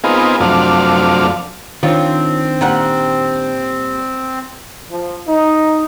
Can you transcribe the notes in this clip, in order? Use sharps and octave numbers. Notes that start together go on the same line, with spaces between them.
B3 C4 D#4 F4 G#4 A#4
F#2 C3 F3 A3 D4 F5
D#3 C4 D4 F4 C#5
A#2 G3 F#5
F3
D#4